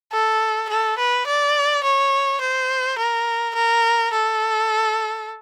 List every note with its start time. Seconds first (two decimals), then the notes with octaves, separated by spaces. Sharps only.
0.12 A4
0.69 A4
0.98 B4
1.27 D5
1.83 C#5
2.41 C5
2.98 A#4
3.55 A#4
4.13 A4